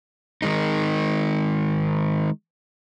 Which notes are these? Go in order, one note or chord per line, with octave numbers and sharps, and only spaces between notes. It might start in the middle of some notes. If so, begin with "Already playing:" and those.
D#3 G#3 D#4